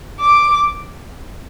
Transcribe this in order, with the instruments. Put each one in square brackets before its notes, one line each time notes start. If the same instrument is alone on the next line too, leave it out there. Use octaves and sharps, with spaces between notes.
[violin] D6